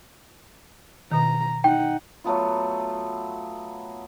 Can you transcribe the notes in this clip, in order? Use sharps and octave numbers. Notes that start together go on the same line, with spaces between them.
B2 D#3 A#5
D#4 F#5 G5
F#3 A3 B3 F4